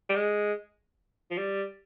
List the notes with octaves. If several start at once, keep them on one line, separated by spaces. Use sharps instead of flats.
G3
G#3
F3
G3